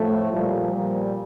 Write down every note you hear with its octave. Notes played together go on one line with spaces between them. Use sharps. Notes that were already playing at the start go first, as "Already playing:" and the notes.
Already playing: A2 F3 A3
A#2 F3 G3
A#2 F3